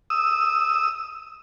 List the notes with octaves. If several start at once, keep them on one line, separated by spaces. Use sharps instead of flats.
D#6 E6